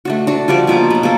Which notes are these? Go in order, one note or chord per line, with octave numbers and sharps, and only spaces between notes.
A3 D4 F#4
D4 F#4
F3 G3 F#4 D5
B2 F3 A#3 D6
F#3 B3
A#3 B3 A4